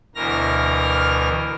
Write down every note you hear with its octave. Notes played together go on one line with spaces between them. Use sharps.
D2 B2 E3 A#4 F6 A#6